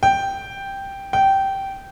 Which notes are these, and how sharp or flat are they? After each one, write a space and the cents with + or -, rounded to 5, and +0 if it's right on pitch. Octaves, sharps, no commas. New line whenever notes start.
G5 +0
G5 -15